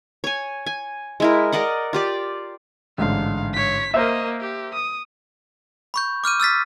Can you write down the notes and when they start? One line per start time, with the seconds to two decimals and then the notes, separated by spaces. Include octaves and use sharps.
0.24 C#5 G#5
0.66 G#5
1.20 G#3 E4 A#4
1.52 A#4 D5 D#5 F#5
1.93 F4 G4 D5
2.98 A1 G#2 D3 F5
3.53 C#5 B6
3.94 A#3 A#4 C5 D#5 E5
4.41 G4
4.74 D#6
5.94 B5 C#6 G6
6.24 D6 F6 G6 D#7
6.40 E6 F6 A6 B6